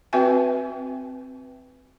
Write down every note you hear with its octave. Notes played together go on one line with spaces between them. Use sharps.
C4 F#4 B4 E5 G5 G#5